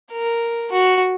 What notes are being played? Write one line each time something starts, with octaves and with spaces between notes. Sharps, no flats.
A#4
F#4